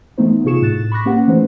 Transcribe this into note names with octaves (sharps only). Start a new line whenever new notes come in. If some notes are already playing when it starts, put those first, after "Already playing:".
E3 A3 B3 D#4 C5
C3 F4 G#4 C#6 C#7 E7
A2 F#6 A6 E7
B5 C#6 D6 F#6 A#6 B6
A#3 C#4 G4 B4 F#5
E3 A3 C#4 D#4 B4 C5